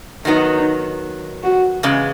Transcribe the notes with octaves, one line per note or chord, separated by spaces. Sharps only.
D#3 F#3 B3 D#4
F#4
E2 C#3 G#3